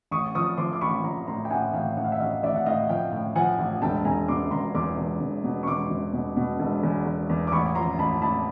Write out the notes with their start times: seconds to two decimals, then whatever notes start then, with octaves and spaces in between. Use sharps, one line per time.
0.11 A1 C#6 D#6
0.35 F3 C#6 D#6
0.58 F3 C6 D6
0.73 D6
0.81 A1 B5 C#6
1.04 F3 A#5 C6
1.27 A2 A#5 C6
1.45 G5
1.50 A2 F#5 G#5
1.74 A1 F5 G5
1.97 A2 F#5
2.04 F5
2.12 E5 F#5
2.20 A1 D#5 F5
2.43 A1 D5 E5
2.56 F#5
2.66 A2 D#5 F5
2.89 F3 F5 G5
3.13 A2
3.36 F3 F#5 G#5
3.59 A1
3.82 E1 G5 A5
4.05 E1 G#5 A#5
4.28 B2 C6 D6
4.51 E1 A#5 C6
4.75 E2 C6 D6
4.97 E1
5.21 E1
5.44 B2
5.63 C#6
5.67 E1 C6 D6
5.90 E1
6.13 B2
6.37 B2
6.60 E1
6.83 E2
7.06 E2
7.29 E2
7.47 D6
7.52 A1 B5 C#6
7.75 F3 A#5 C6
7.99 A1 A5 B5
8.22 A1 A5 B5